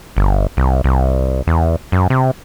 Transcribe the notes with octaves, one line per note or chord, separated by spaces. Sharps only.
G1
C2
C2
E2
F#2
C3